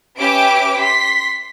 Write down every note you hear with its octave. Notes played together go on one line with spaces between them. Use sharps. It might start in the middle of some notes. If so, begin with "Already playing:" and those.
C#4 G4 B4 E5 D6 D7
C6 B6